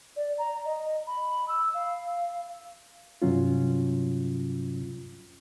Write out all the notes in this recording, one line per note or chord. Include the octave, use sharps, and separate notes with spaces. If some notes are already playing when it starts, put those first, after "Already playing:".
D5
A#5
D#5
B5
E6
F5
G2 C3 F#3 C#4 F4